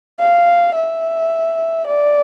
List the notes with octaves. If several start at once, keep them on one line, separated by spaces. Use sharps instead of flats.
F5
E5
D5